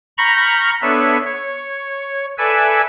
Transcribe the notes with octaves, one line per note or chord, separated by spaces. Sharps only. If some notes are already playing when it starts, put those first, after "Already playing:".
A#5 B5 C#6 F6 G6 A#6
B3 D4 A4 B4 C#5 E5
C#5
A4 B4 D5 E5 G#5 E6